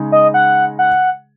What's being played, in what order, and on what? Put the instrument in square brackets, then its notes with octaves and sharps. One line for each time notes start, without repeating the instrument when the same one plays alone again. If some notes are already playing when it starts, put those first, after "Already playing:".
Already playing: [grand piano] C#3 G#3 D#4 G#4
[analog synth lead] D#5
F#5
F#5